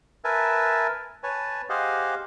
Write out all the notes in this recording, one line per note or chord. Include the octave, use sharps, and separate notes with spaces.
A#4 B4 E5 G#5 A5
B4 C#5 G#5 A5
G4 G#4 C5 D#5 F5 F#5